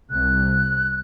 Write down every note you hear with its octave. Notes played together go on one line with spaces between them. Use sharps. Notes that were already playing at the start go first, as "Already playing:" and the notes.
C2 F#6